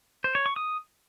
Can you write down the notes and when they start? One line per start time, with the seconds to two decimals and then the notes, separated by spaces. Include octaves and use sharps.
0.24 C5
0.35 C#5
0.46 C#6
0.56 D#6